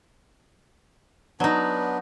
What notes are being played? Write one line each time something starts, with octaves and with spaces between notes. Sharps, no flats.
F#3 B3 D4 D#4